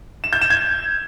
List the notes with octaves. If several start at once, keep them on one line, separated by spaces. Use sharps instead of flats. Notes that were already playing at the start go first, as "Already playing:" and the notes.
E7
G6
E7
G#6